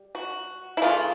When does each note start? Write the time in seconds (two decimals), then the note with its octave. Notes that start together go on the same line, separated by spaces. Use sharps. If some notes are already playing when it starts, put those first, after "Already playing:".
Already playing: G3
0.15 F#4
0.77 E4
0.82 C#3 E3 A3 F4